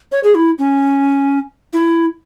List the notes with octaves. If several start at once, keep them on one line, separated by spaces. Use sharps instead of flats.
C#5
G#4
E4
C#4
E4